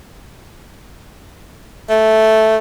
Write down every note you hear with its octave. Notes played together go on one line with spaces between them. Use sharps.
A3